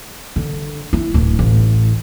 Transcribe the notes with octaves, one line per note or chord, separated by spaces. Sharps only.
D3
E4
D1
A1